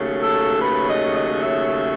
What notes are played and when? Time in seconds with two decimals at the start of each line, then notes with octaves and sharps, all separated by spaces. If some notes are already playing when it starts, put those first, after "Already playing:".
Already playing: D#2 C#3 F#3 A3
0.20 A4
0.60 B4
0.87 D#5
1.15 D#5
1.41 E5